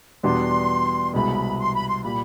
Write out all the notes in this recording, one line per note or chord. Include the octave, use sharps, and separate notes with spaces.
E2 B2 G3 B3 D4 C6
C2 B2 G#3 B5
C6
B5
C6
A#2 G3 B5